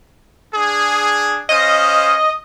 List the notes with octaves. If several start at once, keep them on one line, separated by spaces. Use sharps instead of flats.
D4 G#4
C#4 C5 D#5 F5